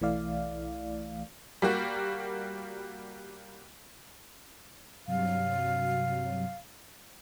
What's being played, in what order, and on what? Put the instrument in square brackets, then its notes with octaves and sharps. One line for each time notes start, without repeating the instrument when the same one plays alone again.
[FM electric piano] B1 E3 A3 E4 D5 F5
[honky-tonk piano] G3 A#3 F#4
[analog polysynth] G2 C3 F#3 [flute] F5